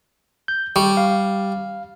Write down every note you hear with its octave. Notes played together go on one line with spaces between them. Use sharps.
G6
G3 C#6
F5